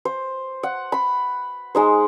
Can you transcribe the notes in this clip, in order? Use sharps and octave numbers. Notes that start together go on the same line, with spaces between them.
C5
F#5
B5 C6
G#3 D#4 C5